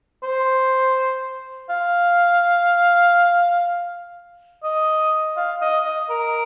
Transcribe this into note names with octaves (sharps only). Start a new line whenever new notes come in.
C5
F5
D#5
F5
D#5
D#5
A#4